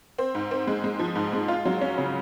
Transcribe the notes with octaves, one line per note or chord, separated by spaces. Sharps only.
C4
G#2
C4
G#3
G#3
F3
G#2
G#3
F4
F#3
C#4
C#3